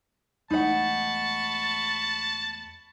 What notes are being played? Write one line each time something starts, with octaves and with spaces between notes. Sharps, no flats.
E2 G#3 A3 D#4 F#5 A5 B5 C#6